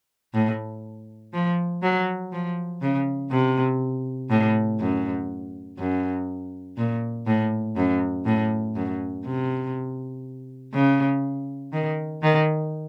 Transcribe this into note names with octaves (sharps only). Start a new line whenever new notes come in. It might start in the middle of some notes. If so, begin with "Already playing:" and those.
A2
F3
F#3
F3
C#3
C3
A2
F#2
F#2
A#2
A2
F#2
A2
F#2
C3
C#3
D#3
D#3